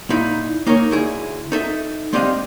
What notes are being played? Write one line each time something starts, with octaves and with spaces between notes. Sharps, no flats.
A#2 D#4 E4
A#3 D#4 A#4 C#5
D2 E4 G#4
D#4 A4 E5
G#3 C4 D4 G4 D#5 F5